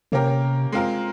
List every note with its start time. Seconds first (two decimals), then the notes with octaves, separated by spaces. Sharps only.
0.12 C3 A#3 C#4 G4 A#4
0.72 G#3 C4 F4 A#4